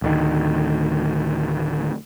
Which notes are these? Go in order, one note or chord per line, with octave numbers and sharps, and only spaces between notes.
D1 D2 D#3